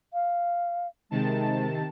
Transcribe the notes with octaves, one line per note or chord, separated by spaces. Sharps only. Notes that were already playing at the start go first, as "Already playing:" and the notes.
F5
C3 D#3 G#3 A5